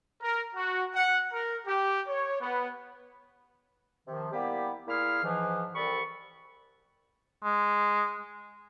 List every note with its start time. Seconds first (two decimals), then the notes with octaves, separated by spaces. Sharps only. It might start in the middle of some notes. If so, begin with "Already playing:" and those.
0.21 A#4
0.55 F#4
0.94 F#5
1.33 A#4
1.66 G4
2.08 C#5
2.41 B3
4.07 C3 D#3 F3
4.32 G3 A#3 B3 E4 G4
4.88 A#2 A#3 E4 G#4 F5 F6
5.23 G#2 E3 F3
5.75 C2 G3 A4 B5 C#6
7.43 G#3